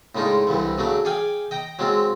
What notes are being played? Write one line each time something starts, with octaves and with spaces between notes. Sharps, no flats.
A2 C#3 G#3 D4 D#4 F4
C2 G2 D3 E3
C#3 F#3 A3 D4
G#4 D5 F5 G5 G#5
D#5 G5 A#5
F#3 G#3 C4 F4